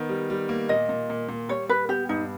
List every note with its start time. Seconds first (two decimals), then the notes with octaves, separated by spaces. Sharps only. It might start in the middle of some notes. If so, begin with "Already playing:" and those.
Already playing: D#3 B3
0.09 G3
0.30 G3
0.49 A#3
0.69 A#2 D#5
0.89 A#2
1.10 A#2
1.29 A#2
1.48 G3 C#5
1.69 G3 B4
1.89 B3 G4
2.09 G2 D#4